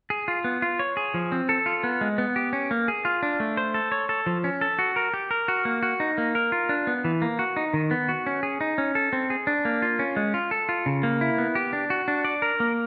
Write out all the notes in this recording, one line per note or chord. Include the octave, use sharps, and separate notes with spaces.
G#4
F4
B3
F4
C#5
G#4
F3
C4
A4
F4
B3
G#3
B3
G4
C#4
A#3
G#4
F4
D4
A3
C5
A4
C#5
A4
F3
C#4
A4
F#4
A#4
G4
A#4
F#4
A#3
F#4
D#4
A#3
A#4
F4
D4
B3
E3
A#3
F#4
D#4
D#3
B3
F#4
C#4
G#4
D#4
C#4
A4
C4
G#4
D4
A#3
F4
C#4
G#3
F4
A4
F4
C#3
A#3
E4
B3
G4
D4
F#4
D4
D5
A#4
A#3